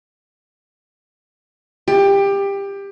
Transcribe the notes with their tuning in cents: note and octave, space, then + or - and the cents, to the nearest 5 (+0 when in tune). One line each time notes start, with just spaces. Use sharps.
G4 +20